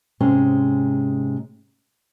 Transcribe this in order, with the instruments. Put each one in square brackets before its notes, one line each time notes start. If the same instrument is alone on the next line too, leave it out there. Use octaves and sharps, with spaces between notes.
[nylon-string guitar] G#2 C3 G#3 C#4